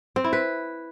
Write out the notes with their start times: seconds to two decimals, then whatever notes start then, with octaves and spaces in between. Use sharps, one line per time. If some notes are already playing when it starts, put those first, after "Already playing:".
0.16 C4
0.24 E4
0.33 B4